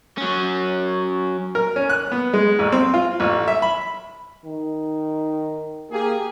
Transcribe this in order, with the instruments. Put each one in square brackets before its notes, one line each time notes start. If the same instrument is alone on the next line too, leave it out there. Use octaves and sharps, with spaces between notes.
[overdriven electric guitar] F#3 C#4
[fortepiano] A#4
C#4
F#6
B3
G#3
A1
C4
F4
A1
E5
B5
[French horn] D#3
[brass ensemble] A#3 G4 G#4